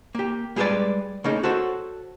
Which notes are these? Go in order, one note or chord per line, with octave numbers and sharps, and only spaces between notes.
A#3 G4
G3 G#3 G#4 A4 B4 D5
C#3 A3 A#3 C#4 D#4
F#4 A4 C5 C#5